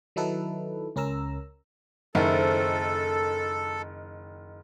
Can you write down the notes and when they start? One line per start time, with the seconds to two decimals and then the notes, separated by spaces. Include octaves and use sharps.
0.16 D#3 F#3 D#4 E4 A4 B4
0.96 C#2 C#4 A#4 A#5 E6
2.15 F#1 D#3 C4 E4 A4